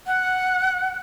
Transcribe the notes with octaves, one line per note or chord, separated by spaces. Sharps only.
F#5